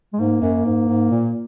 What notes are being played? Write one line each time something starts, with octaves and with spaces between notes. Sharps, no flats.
G#3
G#2 A#3
F#2
G#2
G#2
A#2